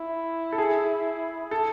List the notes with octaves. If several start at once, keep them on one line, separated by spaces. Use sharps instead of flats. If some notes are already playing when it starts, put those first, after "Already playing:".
Already playing: E4
A4
G#4
A4